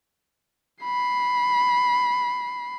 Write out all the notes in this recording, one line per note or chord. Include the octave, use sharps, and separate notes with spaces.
B5 C7